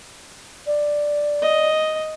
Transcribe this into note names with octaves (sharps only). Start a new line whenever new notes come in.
D5
D#5